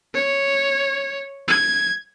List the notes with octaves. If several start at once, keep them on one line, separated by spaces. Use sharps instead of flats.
C#5
G#6